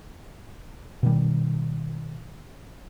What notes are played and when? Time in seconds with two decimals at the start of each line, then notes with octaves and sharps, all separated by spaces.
1.03 B2 D#3 G3